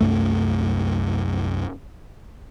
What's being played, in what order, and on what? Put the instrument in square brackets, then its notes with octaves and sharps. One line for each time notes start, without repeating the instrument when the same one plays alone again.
[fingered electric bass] C2 F#2 A3